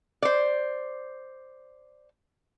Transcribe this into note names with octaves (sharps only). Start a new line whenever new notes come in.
C5 D5